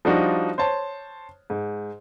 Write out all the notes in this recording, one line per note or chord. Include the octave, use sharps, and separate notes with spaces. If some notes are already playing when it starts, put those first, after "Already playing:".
F3 G3 D4 D#4 F4 F#4
C5 C#5 A5
G#2